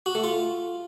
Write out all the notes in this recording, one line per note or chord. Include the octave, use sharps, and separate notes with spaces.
F#4
A3
F4